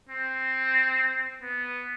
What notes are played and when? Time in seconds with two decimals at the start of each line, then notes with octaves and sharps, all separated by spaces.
0.09 C4
1.42 B3